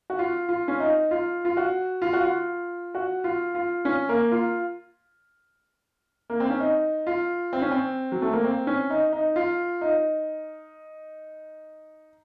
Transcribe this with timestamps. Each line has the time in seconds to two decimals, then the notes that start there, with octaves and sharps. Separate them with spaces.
0.10 F#4
0.19 F4
0.49 F4
0.68 C#4
0.80 D#4
1.11 F4
1.45 F4
1.57 F#4
2.02 F4
2.13 F#4
2.24 F4
2.95 F#4
3.24 F4
3.55 F4
3.85 C#4
4.09 A#3
4.32 F4
6.30 A#3
6.40 C4
6.50 C#4
6.60 D#4
7.07 F4
7.53 C4
7.62 C#4
7.71 C4
8.12 F#3
8.22 A3
8.33 A#3
8.44 C4
8.67 C#4
8.90 D#4
9.13 D#4
9.36 F4
9.81 D#4